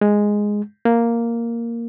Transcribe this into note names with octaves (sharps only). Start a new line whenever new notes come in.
G#3
A#3